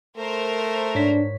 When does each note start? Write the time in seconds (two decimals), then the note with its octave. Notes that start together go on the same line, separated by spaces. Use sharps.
0.17 A3 A#4 C5
0.95 G#2 D4 C#5 B6